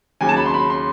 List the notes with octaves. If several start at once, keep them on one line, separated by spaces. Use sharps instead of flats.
D#2 C#3 F#3 G#5
A5
B5
C6
B5
C6